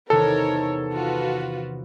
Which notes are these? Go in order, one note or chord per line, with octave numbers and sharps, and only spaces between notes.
E2 C3 D#3 A4 A#4 C#5
F4 F#4 B4